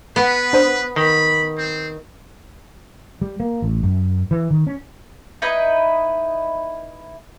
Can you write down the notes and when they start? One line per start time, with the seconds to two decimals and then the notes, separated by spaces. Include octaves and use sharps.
0.16 B3 B4 F#6 C#7 D7
0.53 D4 C5 D#6
0.96 D#3 B5
1.57 C4
3.21 G3
3.40 A#3
3.62 A1
3.83 F#2
4.31 E3
4.51 D#3
4.67 C#4
5.42 D#4 E4 B4 D#5